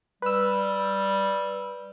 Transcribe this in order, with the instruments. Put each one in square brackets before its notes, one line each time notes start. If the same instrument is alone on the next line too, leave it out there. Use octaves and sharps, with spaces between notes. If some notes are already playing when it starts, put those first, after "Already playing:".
[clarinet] G3 [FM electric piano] B4 E6